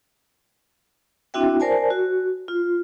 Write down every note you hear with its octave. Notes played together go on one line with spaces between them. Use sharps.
C4 D4 E4 F#4 E5 G5
A#4 C5 D5 G#5 A5
F#4
F4